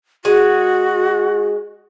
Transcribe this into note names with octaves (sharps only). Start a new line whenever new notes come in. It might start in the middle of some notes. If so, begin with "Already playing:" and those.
G#3 F#4